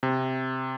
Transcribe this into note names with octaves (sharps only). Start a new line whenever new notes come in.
C3